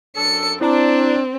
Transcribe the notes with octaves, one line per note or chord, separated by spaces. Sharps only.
F#2 D4 A4 C#7
C4 D4 E4 D5 A#5